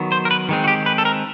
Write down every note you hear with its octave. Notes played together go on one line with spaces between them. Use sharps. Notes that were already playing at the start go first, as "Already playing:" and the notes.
Already playing: D#3 F#3 B3
C5
A#4
B4
D#3 G#3 C4
F#4
G4
B4
A4
A#4